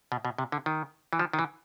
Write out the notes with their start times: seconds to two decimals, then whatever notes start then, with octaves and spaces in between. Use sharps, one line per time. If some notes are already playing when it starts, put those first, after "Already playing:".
0.12 B2
0.25 B2
0.38 C3
0.52 D3
0.66 D#3
1.13 E3
1.19 F3
1.33 D#3
1.39 E3